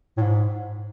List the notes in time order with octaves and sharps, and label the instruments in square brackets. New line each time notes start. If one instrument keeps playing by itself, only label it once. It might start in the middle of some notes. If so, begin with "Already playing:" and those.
[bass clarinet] A2
G#2